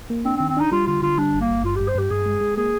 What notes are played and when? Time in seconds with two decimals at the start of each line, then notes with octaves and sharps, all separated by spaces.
0.10 A#3
0.25 C4 D4
0.37 C4
0.40 D#3
0.49 C4
0.57 D4 D#4
0.72 G3 F4
0.87 D3 F4
1.02 D3 F4
1.18 G3 D4
1.34 G1
1.41 A#3
1.49 G1
1.64 G2 F4
1.76 G2 G4
1.88 C5
1.95 G2 G4
2.10 G2 G#4
2.26 G#3
2.41 G#3
2.57 A#3 G#4